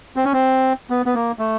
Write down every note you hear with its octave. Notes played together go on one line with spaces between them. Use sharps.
C4
C#4
C4
B3
B3
A#3
A3